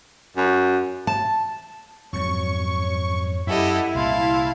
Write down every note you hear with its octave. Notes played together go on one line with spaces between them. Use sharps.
F#2
A5
F2 G#2 F#3 C#5 C#6
F#2 E4 G4 A4 D#5 F#5
C2 A#2 G3 F5 A5 C6